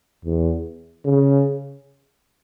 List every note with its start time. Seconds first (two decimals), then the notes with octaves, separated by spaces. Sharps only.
0.25 E2
1.04 C#3